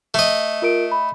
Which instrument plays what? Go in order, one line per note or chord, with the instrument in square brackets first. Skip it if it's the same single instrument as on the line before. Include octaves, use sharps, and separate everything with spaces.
[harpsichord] A3 D#5
[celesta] F4 A#4 D7
B5